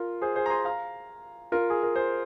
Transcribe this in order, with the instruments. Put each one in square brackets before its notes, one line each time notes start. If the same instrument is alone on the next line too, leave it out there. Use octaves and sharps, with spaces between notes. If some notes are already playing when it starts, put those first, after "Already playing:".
Already playing: [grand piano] F4 A#4
G#4 C5
G#4 C5
A#5
G#5 C6
F5 A#5
F4 A#4
G#4
A#4
G#4 C5